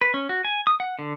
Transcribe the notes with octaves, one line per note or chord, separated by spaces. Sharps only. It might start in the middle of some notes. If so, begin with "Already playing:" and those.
B4
C#4
F#4
G#5
D#6
F#5
D3